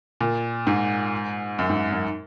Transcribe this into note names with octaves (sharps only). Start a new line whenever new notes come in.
A#2
G#2
F#2
G#2
F#2